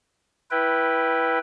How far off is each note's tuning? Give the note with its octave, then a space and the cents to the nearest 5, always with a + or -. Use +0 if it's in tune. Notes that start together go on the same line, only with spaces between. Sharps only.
E4 +0 B4 -10 G5 +0